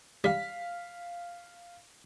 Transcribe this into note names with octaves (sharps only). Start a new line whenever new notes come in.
G3 F5 B6